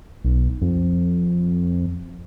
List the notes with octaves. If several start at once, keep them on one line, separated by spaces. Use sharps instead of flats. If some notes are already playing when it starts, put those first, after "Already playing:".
B1
F2